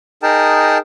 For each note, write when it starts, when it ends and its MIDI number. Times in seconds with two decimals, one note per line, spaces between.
0.23 0.78 63
0.23 0.78 68
0.23 0.78 70
0.23 0.78 79
0.23 0.78 81